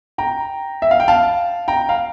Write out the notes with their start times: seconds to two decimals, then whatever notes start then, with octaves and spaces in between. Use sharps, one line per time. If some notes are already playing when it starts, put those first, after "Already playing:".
0.18 G5 A#5
0.82 E5
0.91 F5
1.00 G5
1.08 F5 A5
1.68 G5 A#5
1.89 F5